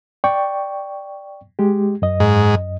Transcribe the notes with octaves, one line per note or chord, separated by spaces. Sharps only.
D5 G5 C#6
G#3 G4
F#2 D#5
G#2